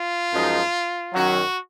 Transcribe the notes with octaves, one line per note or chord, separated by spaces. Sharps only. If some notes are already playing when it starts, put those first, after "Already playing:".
Already playing: F4
F#2 F3 G#3 D#4
F#2 D#3 F#3 C#4 F#4